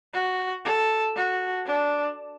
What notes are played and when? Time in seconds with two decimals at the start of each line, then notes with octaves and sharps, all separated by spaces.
0.13 F#4
0.65 A4
1.15 F#4
1.66 D4